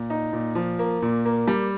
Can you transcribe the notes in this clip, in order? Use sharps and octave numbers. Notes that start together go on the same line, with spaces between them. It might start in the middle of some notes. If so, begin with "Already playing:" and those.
Already playing: A#2
D#4
A#2
F3
A#3
A#2
A#3
G3